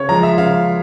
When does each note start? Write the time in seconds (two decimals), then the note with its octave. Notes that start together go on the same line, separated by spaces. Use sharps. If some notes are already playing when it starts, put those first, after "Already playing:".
Already playing: C#3 C#5
0.09 F3 G#3 A#5
0.23 E5
0.38 C#3 F5